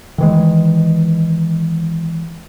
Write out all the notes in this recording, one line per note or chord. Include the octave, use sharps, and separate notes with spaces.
D#3 E3 G#3